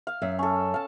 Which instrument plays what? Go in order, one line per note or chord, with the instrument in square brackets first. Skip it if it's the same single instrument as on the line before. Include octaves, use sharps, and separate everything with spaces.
[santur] F5
[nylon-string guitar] F#2 E5
[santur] C#4 A4
F5 A5